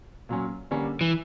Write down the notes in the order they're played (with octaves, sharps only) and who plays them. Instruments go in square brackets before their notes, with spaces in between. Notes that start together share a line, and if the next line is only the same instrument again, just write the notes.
[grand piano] A#2 F#3 C#4
D3 G3 A#3 C#4
[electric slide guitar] E3